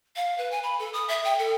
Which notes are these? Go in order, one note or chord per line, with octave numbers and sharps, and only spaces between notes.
F5
B4
G#5
B5
A4
D#6
E5
G5
A4